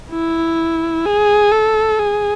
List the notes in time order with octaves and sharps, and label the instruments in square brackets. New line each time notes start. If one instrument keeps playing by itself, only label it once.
[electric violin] E4
G#4
A4
G#4